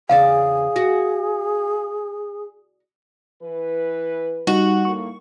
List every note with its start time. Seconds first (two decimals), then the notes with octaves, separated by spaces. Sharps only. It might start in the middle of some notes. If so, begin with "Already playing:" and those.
0.09 E2 C#3 G#4 D5 F5
0.76 F#4
3.43 E3 B4
4.47 G3 D#4 F#4
4.85 A2 A#3 C#6